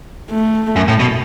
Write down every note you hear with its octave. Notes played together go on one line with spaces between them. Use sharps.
A3
F#2
A2
B2